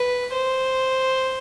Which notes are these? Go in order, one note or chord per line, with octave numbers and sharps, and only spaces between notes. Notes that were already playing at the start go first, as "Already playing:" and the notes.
Already playing: B4
C5